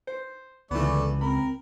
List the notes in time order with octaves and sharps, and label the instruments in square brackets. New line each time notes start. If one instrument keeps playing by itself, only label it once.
[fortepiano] C5
[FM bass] C#2 [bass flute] D3 [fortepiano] E3 B3 [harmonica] A3 D5
[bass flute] C4 [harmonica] A#4 [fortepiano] B5